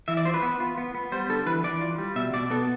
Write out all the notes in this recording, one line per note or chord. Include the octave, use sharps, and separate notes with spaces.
E3 E5
D5
F4 C5
B4
B3
F4
B3
B3
G3 C5
D3 A4
E3 B4
E3 D5
F4
G3
B2 E5
B2 D5
B3 A4